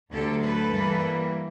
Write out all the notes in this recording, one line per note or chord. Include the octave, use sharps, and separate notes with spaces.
D2 D3 F#3 A3 G4 A4
A4 B4
G2 E3 G3 A#3